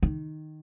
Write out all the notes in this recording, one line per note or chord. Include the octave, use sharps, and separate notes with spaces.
D#3